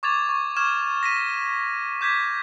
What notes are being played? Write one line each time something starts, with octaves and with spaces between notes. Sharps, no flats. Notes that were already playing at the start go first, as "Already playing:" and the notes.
C#6 D6 G#6 A6 F7
C#6
C#6 D6 F6 G#6 E7
A#6 B6 D#7
D6 G6 G#6 B6